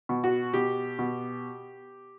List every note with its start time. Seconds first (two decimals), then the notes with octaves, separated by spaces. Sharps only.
0.09 B2
0.24 F#4
0.54 B2 G4
0.99 B2